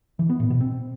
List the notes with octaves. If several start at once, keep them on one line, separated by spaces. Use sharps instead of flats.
E3
B3
A2
B2
C4